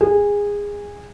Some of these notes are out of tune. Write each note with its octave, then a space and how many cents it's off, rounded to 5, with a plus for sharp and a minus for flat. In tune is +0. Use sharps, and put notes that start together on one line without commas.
G#4 -20